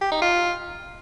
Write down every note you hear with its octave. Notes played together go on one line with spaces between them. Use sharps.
G4
D#4
F4